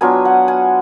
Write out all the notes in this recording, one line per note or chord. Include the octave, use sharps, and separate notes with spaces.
F#3 B3 D4 F4 G#5
F#5
G#5